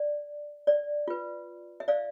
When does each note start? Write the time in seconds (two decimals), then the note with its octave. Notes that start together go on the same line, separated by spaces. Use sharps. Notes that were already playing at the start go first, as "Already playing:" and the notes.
Already playing: D5
0.67 D5
1.08 F4 B4
1.80 E5
1.88 D5 F5